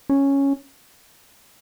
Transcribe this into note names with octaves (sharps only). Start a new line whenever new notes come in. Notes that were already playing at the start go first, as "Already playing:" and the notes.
C#4